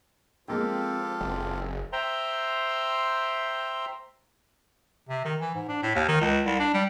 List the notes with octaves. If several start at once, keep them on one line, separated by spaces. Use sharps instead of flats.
F3 G#3 A#3 C4 F4 G4 A4 G5
F#1 C4 G#4
C5 E5 G5 A#5 C6
C3
D#3
E3
G#2
D4
A2
D#2
D#3
C#2
C2
D4
G3